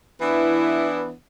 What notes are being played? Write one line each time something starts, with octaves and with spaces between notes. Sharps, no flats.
E3 B3 D4 E4